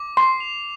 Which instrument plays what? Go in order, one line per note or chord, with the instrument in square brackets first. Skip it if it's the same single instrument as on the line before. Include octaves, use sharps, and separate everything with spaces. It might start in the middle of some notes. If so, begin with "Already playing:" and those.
Already playing: [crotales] D6
[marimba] C6 [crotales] C7
[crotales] F7